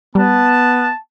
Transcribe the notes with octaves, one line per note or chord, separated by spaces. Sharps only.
G3 B3 A5